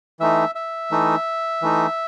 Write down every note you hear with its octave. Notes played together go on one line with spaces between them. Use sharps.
E3 A3 D#4 E5
E5
E3 A3 D#4
E3 A3 D#4